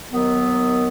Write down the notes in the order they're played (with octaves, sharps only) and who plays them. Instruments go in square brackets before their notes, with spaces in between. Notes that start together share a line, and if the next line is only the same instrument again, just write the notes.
[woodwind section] D#2 D#3 F#3 B3